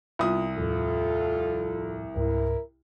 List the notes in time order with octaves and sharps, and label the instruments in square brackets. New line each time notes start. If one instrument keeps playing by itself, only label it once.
[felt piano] C2 D#6 [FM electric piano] B3 F4
[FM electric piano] D#2 A2 F3 [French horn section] F4 A4
[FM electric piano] C#2 G#2 [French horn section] E4 A#4